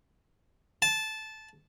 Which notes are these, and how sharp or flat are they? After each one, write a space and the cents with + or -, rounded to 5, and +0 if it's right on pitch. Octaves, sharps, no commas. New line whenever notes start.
A5 -15